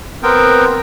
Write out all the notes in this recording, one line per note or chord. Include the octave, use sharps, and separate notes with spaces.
B3 C4 A#4 G5